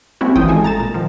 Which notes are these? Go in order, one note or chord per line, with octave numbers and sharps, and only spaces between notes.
G3 A#3 C4 C#4 E4 F#4
G#1 E3 F4 G5 D#6
G#3 A4 G#5
A#5 A6 E7
A#2
D#3 F3